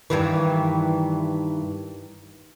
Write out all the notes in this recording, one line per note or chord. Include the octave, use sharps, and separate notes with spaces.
G2 D#3 E3